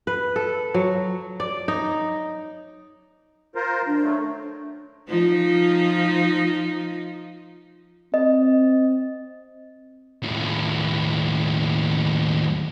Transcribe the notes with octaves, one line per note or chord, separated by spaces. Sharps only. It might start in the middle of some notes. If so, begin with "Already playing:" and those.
B4
A4
F#3
D5
D#4
F4 A#4 C5
D#3 D4
F#3 A3
F3 D#4 F4
C4 D#5
D#2 A2